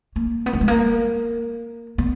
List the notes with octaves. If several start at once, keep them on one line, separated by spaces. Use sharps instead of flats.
A#3
B3
A#3
G#3
A#3
B3